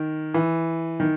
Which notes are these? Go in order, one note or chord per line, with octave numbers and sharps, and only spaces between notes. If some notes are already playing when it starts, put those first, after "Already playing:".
Already playing: D#3
E3
D#3